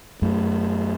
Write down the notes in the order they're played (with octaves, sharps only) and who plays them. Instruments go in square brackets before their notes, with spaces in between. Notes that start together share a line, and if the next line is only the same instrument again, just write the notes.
[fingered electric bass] F#2 A3